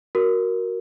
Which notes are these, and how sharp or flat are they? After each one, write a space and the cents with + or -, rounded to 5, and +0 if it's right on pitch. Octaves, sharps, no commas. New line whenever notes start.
F#4 +0 A#4 +0